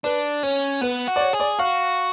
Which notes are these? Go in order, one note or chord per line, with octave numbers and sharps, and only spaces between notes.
D4 B4
C#4 C#5
B3 B4
F#4
D5
C#5
G#4
D5
F#4 F5